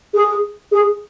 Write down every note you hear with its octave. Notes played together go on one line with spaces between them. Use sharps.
G#4
G#4